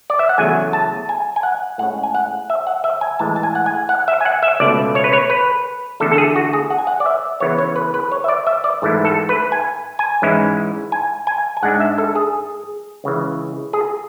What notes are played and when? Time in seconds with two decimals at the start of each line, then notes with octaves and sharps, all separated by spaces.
0.10 D5
0.19 E5
0.29 F#5
0.38 E2 C#3 F#3 A3 G#5
0.73 A5
1.09 G#5
1.36 G#5
1.43 F#5
1.78 A2 G#3 C#4 F#5
2.03 G#5
2.15 F#5
2.50 E5
2.67 F#5
2.84 E5
3.01 G#5
3.19 A2 E3 G#3 A5
3.36 A5
3.43 G#5
3.55 F#5
3.66 G#5
3.89 F#5
4.08 E5
4.21 G#5
4.25 F#5
4.43 E5
4.60 C#2 B2 A3 D5
4.95 C#5
5.04 B4
5.13 C#5
5.30 B4
6.00 E2 D3 A3 D4 A4
6.12 A4
6.18 G#4
6.36 F#4
6.53 G#4
6.70 F#5
6.78 G#5
6.87 F#5
7.00 D5
7.06 E5
7.40 C#3 E3 B3 E4 C#5
7.58 C#5
7.76 B4
7.94 B4
8.12 C#5
8.24 E5
8.28 D5
8.47 E5
8.64 D5
8.82 G#2 E3 A3 E4
9.05 A4
9.29 B4
9.52 G#5
9.99 G#5
10.22 G#2 E3 G#3 C#4 E4
10.92 G#5
11.27 G#5
11.57 G#5
11.63 G#2 G#3 D4 F#5
11.80 E5
11.98 A4
12.15 G#4
13.04 C#2 C#3 E3
13.73 G#4